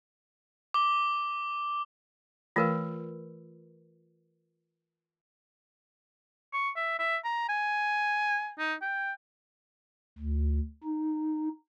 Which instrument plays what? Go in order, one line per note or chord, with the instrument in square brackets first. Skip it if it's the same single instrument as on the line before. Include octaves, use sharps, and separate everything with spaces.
[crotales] D6 G7
[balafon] E3 A3 F5 [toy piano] F4 A#4 B4
[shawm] C#6
E5
E5
A#5
G#5
D#4
G5
[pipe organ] D2
D#4